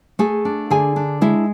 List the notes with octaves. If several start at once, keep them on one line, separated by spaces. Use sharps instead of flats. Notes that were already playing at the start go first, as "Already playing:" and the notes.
A3 G#4 G#5
D4
D3 G#4 G#5
D4
G#3 E4 E5